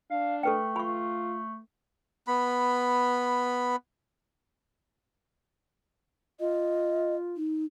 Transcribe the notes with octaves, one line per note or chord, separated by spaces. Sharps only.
D4 F5
A3 A4 B4 G5
F4 B5 C#6
B3 B5
F4 D#5
D#4